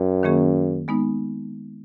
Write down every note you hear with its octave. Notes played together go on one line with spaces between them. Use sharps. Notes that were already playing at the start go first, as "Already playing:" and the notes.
Already playing: F#2
D#3 A#3 C#4 G#4
G#3 B3 D#4